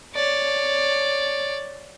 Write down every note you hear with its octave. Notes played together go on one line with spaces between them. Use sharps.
C#5 D5